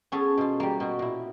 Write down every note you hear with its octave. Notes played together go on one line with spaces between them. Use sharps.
B3 C#4 G#4 A4
B2 F4
G3 A#3
B2 F#4
A#2 E4